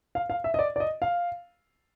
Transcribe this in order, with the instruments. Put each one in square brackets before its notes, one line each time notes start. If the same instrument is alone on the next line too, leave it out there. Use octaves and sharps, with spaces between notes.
[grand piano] F5
F5
E5
D#5
D5
D5
D#5
F5